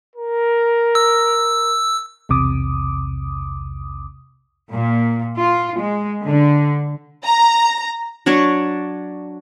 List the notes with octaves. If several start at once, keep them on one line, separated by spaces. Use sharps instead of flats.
A#4
E6
B1 E2 C3 D6 D#6
A#2
F4
G#3
D3
A#5
F#3 D4 C#5 D5